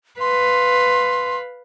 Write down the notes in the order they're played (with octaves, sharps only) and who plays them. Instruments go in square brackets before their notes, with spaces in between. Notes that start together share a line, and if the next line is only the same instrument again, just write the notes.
[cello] B4 F5 [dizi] C6